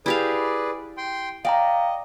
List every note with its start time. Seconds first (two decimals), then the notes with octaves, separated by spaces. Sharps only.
0.06 E4 G4 G#4 B4 D5 F5
0.97 G5 C6
1.45 D5 D#5 F5 G5 A#5